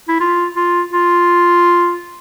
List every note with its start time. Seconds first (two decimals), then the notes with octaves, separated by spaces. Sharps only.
0.08 E4
0.20 F4
0.56 F4
0.93 F4